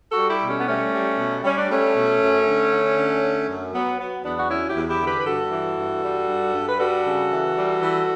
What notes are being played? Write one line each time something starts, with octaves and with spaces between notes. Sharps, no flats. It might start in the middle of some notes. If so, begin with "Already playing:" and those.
F#4 A4
G3
E4 G4
B2
A3 C#4
B3
G3 A3 C#4
G3
B2
G3 C#4
D4
G3 A3 C#4
B2
F#2
D3
D3
D3
D3
F#2
F#3 B3
F#3 B3
E2 B3 D4
F#4
F#3 C#4 E4
E4 G4
E2
E4 G4
D3
G4 B4
B4
G2 F#4 A4
E3
G2
G3
G2
G2
B4
G3 F#4 A4
C#3
E3
G3
E3